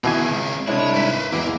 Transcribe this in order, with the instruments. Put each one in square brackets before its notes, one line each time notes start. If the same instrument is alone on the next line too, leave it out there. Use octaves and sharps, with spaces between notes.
[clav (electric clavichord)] B2 E3 G#5 [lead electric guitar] C4 G#4
[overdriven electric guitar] C#2
[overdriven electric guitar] C2 E4 [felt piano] G#3 C4 D4 [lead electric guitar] C#5
[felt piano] G#1 [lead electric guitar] B4 C5
[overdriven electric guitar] E2 [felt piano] G#3 B3 E4 [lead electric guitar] A#3